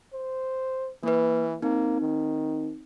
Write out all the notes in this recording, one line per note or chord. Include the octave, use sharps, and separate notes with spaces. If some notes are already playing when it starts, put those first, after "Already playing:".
C5
E3 A#3 B4
A#3 C4 D#4
D#3